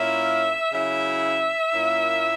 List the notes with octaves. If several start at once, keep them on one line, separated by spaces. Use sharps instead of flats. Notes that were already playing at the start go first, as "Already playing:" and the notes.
Already playing: A#2 A#3 C#4 E4 E5
C#3 F#3 C#4 E4 E5
A#2 A#3 C#4 E4